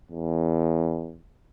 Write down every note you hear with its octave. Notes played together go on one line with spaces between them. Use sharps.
E2